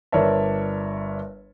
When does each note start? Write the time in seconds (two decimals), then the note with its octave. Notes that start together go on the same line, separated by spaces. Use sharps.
0.12 G1 A#4 C#5 D5 E5 A5